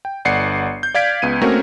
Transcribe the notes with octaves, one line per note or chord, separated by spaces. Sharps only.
G5
G1 D5 F#5 C7 C#7
G6
D5 F5 G#6 B6 D7
C#2 B3 D#7
A3 A#3 C4 C#4 F#4 A#4